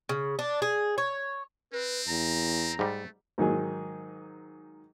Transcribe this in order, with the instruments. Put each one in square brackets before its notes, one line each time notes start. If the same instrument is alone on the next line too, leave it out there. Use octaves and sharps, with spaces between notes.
[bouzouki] C#3
D4
G#4
C#5
[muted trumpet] C4 [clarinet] B4
[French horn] E2 [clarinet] A#5
[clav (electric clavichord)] G#2 G3 [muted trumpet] A3
[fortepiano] G#2 D#3 F#3 G#4